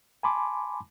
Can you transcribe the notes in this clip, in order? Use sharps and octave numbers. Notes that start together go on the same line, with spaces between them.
G#5 A5 B5 C6 D6